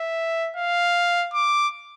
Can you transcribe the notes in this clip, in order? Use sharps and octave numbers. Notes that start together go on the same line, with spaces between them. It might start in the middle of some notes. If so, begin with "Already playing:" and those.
Already playing: E5
F5
D6